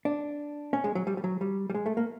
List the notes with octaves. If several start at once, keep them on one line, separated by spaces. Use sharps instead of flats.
D4
C#4
G#3
F#3
G3
G3
F#3
G3
G3
G#3
A3
A#3